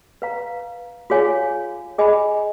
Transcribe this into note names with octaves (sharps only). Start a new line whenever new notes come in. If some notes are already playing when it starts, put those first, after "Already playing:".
B4 F5 A#5
F4 G#4 C#5 F5 G#5
G#4 D#5 G#5 B5